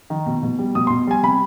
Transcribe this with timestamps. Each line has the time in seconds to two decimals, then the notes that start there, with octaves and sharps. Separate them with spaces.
0.10 D#3
0.26 B2
0.43 B2
0.59 G3
0.75 B2 D#6
0.87 B2 C6
1.07 G3 G#5
1.23 C3 B5